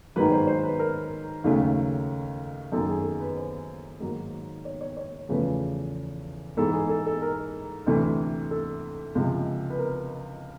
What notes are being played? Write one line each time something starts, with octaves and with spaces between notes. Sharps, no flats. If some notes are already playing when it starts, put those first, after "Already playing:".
G#2 D#3 F#3 A#3 B4
C5
C5
B4
A#4
D#2 C#3 F#3 A3
F#2 D#3 F#3 A#3 A4
G#4
A4
B4
C5
G#2 D#3 F#3 A#3
C#5
C#5
C#5
E2 C#3 F3 A3 B4
G#2 E3 G#3 A4
G#4
A4
A4
A#4
D2 C3 E3 A3
A4
C#2 C3 F3 G#3
B4
A#4